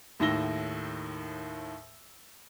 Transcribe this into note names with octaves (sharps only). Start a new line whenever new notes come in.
D#2 A2 D#3 E6 A#6 G7